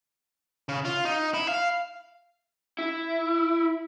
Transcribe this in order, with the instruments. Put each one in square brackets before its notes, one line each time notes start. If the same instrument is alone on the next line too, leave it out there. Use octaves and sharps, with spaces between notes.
[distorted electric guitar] C#3
F4
D#4
E4
F5
[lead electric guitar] E4